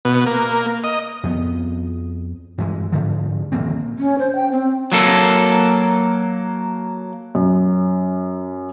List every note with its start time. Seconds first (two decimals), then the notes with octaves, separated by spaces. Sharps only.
0.05 B2
0.26 A#3
0.84 D#5
1.23 F2 B3
2.58 G2 E3 G#3
2.92 G#2 D3 F3
3.52 D#1 A#1 A#3 C4
3.99 C#4
4.19 C5
4.35 G5
4.52 C4
4.92 F#3 A#3 A4
7.35 F#2